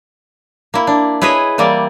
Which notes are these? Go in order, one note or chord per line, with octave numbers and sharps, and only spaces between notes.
A#3 E4
D4
E4 G#4 B4 C#5 D#5 E5
E3 G3 A#3 C4 D5